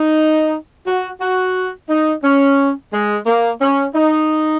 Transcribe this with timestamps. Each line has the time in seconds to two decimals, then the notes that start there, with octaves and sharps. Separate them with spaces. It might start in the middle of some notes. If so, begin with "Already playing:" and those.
Already playing: D#4
0.86 F#4
1.20 F#4
1.89 D#4
2.23 C#4
2.92 G#3
3.26 A#3
3.61 C#4
3.95 D#4